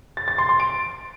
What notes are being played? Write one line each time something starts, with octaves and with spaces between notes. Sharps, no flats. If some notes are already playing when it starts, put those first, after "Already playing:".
A6
A6
C6
C6
D7